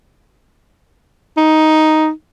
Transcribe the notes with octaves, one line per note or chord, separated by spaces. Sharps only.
D#4